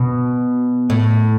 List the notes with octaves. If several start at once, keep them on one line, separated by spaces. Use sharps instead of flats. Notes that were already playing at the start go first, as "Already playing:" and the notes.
Already playing: B2
A2